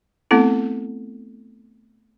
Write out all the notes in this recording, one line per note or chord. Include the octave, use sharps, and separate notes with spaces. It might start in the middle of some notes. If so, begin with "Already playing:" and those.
A3 B3 C4 E4 A4